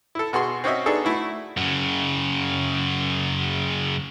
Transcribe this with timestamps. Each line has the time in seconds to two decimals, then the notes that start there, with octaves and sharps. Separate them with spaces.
0.15 E4 A4
0.33 B2 F#4 G#4 C6
0.64 C4 C#4 F#4 D#5 E5
0.86 B3 D4 D#4 G#4 A4
1.05 A3 E4 F#4
1.57 F#2 C#3